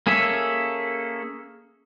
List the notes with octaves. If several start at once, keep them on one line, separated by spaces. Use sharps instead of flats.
A#3 C#4 G#4 A4 E5